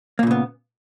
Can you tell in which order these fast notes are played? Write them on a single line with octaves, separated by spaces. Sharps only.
A#3 A#2 C#3 B3